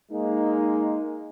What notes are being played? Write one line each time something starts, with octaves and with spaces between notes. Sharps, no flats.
G#3 A#3 D#4